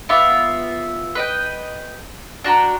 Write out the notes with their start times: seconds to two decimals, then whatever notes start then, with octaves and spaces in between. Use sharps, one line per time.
0.09 B3 F4 E5 D6
1.15 B4 D#5 G5
2.44 D4 F#4 G5 A#5